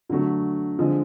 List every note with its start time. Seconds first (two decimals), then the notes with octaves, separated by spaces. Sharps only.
0.09 D3 F#3 A3
0.79 D3 F3 G#3